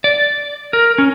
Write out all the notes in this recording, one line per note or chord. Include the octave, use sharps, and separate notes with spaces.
D5
A#4
C#4